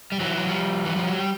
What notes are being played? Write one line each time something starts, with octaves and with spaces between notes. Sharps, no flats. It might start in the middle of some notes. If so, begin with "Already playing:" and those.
G3
E3 F#3
F#3
F3 G3
E3
F3
F#3
G3